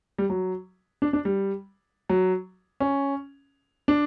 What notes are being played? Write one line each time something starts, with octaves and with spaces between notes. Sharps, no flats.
G3
F#3
D4
D4
G3
F#3
C#4
D4